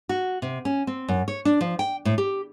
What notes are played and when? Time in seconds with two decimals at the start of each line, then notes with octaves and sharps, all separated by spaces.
0.09 F#4
0.42 C3
0.65 C#4
0.87 C4
1.08 F#2
1.28 C#5
1.45 D4
1.61 F3
1.79 G5
2.05 A2
2.18 G4